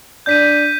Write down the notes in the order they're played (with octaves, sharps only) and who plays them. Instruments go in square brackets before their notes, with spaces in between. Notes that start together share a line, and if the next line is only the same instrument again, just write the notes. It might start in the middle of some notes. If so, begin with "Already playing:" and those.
[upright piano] D4 [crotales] G6 B6 D#7